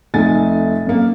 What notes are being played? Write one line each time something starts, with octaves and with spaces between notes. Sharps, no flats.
F1 A3 D#4 E5 G#5 A6
F#2 A#3